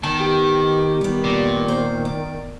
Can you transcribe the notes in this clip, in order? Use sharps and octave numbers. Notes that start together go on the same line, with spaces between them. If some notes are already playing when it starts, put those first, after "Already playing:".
D#3 B3 A5
G4
D#3 G3 B3
A#2
C5
D5